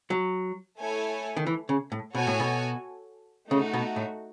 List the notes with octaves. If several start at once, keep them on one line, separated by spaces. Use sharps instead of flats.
F#3
A3 E4 A4 C#5 G#5
D#3
E3
C#3
A2
B2 F#4 A4 C#5 G#5
A2
B2
C#3 A3 D#4 F#4
B2
A2